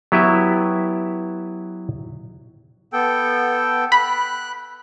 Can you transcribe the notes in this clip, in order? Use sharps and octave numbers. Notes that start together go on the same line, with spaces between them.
F#3 B3 E4 G4 B4 E5
B3 A4 G5
B5 F#6